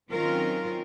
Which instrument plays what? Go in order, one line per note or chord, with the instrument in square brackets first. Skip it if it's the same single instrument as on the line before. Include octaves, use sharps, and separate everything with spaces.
[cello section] D#3 F#3 C4 C#4 F4 A#4